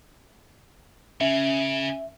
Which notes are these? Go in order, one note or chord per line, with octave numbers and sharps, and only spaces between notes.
C#3 C#4 E5